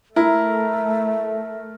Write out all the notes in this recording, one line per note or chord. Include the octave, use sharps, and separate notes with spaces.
A3 E4 A#4 E5